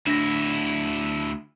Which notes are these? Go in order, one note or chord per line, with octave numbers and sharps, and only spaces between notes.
D2 D4 E4 A#6